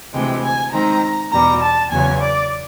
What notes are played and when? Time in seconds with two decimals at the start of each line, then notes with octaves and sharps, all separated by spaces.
0.13 D2 C3 E3 G#3 G5
0.43 G#5
0.72 D#3 G#3 C4 D#4 A#5
1.32 E2 B2 G3 A#5
1.62 A5
1.91 E2 C#3 F#3 B3 G#5
2.21 D5